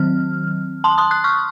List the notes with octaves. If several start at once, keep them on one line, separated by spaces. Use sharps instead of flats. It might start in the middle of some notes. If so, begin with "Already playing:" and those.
Already playing: D#3 F#3 C4 F6
A5 C6
C6 D#6
D#6 F#6
C#6 F6